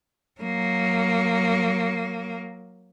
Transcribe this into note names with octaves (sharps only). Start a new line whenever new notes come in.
F#3 A#3